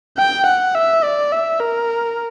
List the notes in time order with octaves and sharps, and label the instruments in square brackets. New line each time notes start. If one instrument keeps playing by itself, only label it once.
[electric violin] G5
F#5
E5
D5
E5
A#4